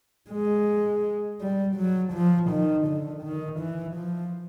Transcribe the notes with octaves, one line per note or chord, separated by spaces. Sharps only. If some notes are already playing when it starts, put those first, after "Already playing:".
G#3
G3
F#3
F3
D#3
D3
D#3
E3
F3